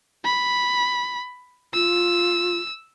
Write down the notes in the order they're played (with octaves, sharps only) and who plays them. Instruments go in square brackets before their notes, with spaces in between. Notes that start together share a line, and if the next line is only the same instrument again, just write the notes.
[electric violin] B5
[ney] F4 [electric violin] E6